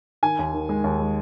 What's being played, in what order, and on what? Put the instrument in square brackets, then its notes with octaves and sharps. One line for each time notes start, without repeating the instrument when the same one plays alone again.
[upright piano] D#3 G#5
D#2
D#3
G#3
D#2
G#3